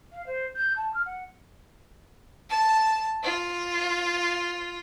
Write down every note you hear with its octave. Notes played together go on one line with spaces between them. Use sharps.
F5
C5
G6
A5
F6
F#5
A5
F4